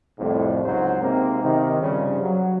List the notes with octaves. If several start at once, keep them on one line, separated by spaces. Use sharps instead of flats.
C2 F2 A2
C#2 G#2 F#3 C5
G#2 C3 A#3 C4
C3 D#3
G2 C#3 F3 G3
F#3